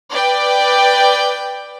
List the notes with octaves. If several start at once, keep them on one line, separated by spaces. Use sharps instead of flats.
B4 D5 G5